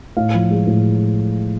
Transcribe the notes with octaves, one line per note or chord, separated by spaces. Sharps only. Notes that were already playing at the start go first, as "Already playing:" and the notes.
A2 F5
F3
G#3
A2